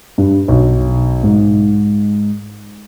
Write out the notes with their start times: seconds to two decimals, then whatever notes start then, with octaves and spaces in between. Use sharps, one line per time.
0.18 G2
0.48 B1
1.24 G#2